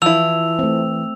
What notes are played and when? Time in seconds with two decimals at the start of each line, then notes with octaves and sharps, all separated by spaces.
0.02 E3 F3 E4 E6 F7
0.59 A3 C4